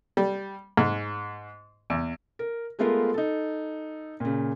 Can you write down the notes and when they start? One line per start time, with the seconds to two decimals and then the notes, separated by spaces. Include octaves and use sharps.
0.17 G3
0.77 G#2
1.90 E2
2.39 A#4
2.79 G#3 A3 B3 F4 A#4 F5
3.14 D#4 A4
4.20 A#2 C#3